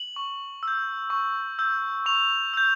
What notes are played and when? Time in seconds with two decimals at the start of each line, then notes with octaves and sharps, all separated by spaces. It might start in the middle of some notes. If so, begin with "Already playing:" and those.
Already playing: F#7
0.16 C#6
0.63 E6 G6
1.10 C#6
1.59 E6 G6
2.06 C#6 F7
2.53 E6 G6